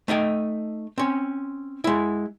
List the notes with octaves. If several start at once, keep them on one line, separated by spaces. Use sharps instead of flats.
A3 D#4 D#5 G5
C4 C#4
G#3 E4